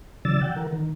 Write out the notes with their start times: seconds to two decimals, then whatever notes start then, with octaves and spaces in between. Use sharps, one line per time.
0.25 C#3 E3 F#3 D5 E6 A6
0.41 F#5 G5
0.56 E3 A#4
0.73 D#3